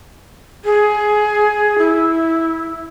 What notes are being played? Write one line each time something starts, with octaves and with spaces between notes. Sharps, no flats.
G#4
E4